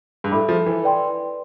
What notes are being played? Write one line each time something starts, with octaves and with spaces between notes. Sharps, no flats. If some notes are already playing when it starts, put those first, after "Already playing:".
G2
A2 A4 E5 B5 D6
F3
E3
B4 D5 G5 C6